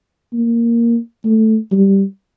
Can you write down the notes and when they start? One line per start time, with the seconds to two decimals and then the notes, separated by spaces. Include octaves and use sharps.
0.34 A#3
1.25 A3
1.72 G3